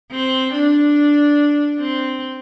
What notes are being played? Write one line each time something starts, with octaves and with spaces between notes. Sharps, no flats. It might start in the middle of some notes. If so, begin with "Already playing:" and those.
C4
D4
C4